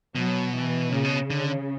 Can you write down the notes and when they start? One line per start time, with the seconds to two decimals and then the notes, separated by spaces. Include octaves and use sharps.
0.15 B2 F#3
0.54 E3
0.92 A#2 C#3
1.04 B2
1.30 D3